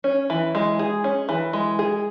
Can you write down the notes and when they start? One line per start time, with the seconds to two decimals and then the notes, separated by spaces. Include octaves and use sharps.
0.04 C#4
0.30 E3
0.55 G#3
0.79 G#4
1.04 C#4
1.29 E3
1.53 G#3
1.79 G#4